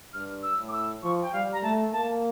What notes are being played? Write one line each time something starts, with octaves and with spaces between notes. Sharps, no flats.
G2 F6
E6
A2
D6
E6
F3 C#6
G5
G3 F5
A#5
A3 A5
A#3 A5